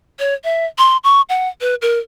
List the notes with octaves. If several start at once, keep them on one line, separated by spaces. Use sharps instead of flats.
C#5
E5
C6
C#6
F#5
B4
A#4